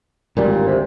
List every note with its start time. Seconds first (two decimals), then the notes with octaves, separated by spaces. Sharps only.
0.37 G#1 D2 A#2 G3
0.67 C3